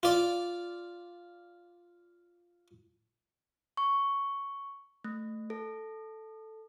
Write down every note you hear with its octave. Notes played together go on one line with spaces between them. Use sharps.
F4 D5
C#6
A3
A4